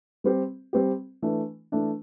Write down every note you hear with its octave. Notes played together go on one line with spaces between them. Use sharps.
G3 C4 G4
G3 C4 G4
E3 A3 D4
E3 A3 D4